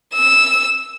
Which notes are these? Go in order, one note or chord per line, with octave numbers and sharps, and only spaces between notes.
E6